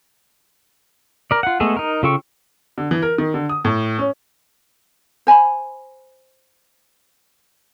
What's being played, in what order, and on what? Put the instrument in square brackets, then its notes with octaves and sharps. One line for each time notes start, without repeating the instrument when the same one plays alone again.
[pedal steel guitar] A#4 D5
F4 F#5
G#3 A3 B3 G#4 A4
D#4 A#4
C#3 F4 A4 G5 C#6
[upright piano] D3
E3
A#4
D#3
D3
D#6
A2
C#4
[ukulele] C5 G#5 A#5 B5